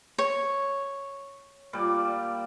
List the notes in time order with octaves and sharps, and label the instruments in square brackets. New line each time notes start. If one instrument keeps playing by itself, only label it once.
[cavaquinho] C#5
[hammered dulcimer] A#2 G3 D5